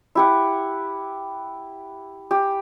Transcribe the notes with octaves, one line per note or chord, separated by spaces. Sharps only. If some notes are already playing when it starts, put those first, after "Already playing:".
E4 G4 F#5
G4